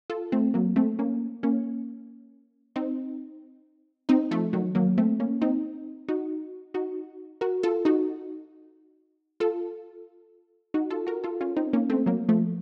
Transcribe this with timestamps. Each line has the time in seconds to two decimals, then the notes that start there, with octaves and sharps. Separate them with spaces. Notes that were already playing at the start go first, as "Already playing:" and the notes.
0.10 F4 A4
0.32 A3 C4
0.54 F#3 A#3
0.76 A3 C4
0.99 A#3 C#4
1.43 A#3 C#4
2.76 C4 D#4
4.09 C4 D#4
4.31 F3 A3
4.53 D#3 F#3
4.75 F#3 A#3
4.98 A3 C4
5.20 A#3 C#4
5.41 C4 D#4
6.09 D#4 F#4
6.74 D#4 F#4
7.41 F#4 A#4
7.63 F4 A4
7.85 D#4 F#4
9.40 F4 A4
10.74 D#4 F#4
10.90 F4 A4
11.07 F#4 A#4
11.24 F4 A4
11.41 C#4 F4
11.57 C4 D#4
11.73 A#3 C#4
11.90 A3 C4
12.06 F#3 A#3
12.29 F3 A3